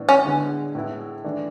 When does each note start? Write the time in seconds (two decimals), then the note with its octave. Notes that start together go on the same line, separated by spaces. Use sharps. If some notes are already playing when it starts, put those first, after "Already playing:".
Already playing: A2 E3 B3 D4
0.09 C#4
0.25 D3 G#3 B3
0.75 A2 G#3 B3 E4
1.24 E3 A3 D4